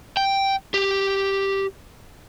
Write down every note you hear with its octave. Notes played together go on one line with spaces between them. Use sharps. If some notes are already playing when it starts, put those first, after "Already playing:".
G5
G4